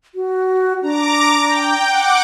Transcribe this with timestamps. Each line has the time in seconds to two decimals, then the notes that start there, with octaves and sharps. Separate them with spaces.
0.15 F#4
0.83 D4 A#5 D6
1.47 G5
1.87 F#5 D6